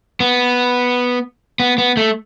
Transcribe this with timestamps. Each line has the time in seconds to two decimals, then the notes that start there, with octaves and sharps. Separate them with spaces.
0.20 B3
1.60 B3
1.78 B3
1.97 A3